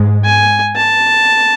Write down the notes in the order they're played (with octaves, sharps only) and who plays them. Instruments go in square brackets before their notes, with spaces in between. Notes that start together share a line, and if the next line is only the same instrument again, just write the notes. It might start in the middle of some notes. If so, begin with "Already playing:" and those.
Already playing: [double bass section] G#2 G#3
[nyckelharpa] G#5
A5